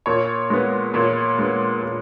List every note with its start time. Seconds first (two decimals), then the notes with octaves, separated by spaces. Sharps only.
0.06 A#2 C#5
0.50 G#3 B3
0.94 A#2 C#5
1.39 G#3 B3
1.83 A#2